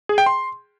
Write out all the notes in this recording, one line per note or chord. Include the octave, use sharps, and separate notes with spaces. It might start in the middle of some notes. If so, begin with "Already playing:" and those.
G#4
G5
C6